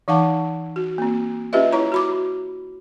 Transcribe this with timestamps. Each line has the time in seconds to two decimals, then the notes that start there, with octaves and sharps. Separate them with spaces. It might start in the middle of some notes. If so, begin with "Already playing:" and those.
0.08 E3 D#4 F5 F#5 A5
0.76 F#4
0.98 A#3 C4
1.53 C#4 F4 G4 B4 D#5 E5
1.72 E4 C#5 A#5
1.92 F#4 B5 D6